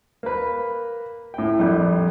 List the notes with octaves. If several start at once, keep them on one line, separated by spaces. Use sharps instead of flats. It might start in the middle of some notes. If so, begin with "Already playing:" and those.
A#3 B4
A2 G5
A#1 F2 G3 G4